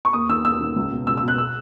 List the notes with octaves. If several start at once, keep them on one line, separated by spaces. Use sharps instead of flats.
C#6
D#2 D#6
D#3 E6
D#2 E6
D#3
C#2
B2
C#2 E6
E6
B2
F#6
E6